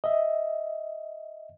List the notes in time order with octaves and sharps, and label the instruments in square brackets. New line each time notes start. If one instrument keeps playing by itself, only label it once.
[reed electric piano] D#5 E5